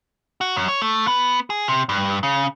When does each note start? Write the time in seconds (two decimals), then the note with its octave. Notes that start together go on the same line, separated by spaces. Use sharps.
0.41 F#4
0.56 F#2
0.68 C#5
0.82 A3
1.08 B3
1.50 G#4
1.69 C3
1.89 G2
2.23 C#3